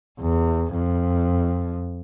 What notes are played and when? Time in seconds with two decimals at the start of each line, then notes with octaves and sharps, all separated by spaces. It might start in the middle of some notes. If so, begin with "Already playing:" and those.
0.21 E2
0.75 F2